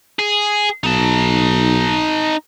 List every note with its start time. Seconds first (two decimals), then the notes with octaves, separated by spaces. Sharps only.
0.19 G#4
0.84 B1 D#4 A5